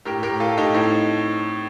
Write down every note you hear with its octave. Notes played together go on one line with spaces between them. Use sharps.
A2 G4 A#4
A2 G4 A#4
A2 F4 A4
A2 D#4 G4
A2 C4 D#4